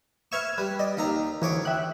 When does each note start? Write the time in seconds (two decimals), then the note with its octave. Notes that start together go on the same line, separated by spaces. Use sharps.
0.32 B4 E5 C#6 F6 G#6 E7
0.58 G3 B4
0.79 D5 D#5
0.97 D#2 D#3 A#5
1.42 D2 E3 C#5 D6
1.65 E5 G5 F#6